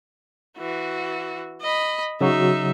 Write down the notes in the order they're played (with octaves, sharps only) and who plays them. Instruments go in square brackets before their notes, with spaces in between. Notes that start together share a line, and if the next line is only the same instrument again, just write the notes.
[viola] E3 F#4
D#5 B5
[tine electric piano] C#3 F#3 F#4 [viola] D#4 E5